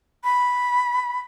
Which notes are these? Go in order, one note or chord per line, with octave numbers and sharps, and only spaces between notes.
B5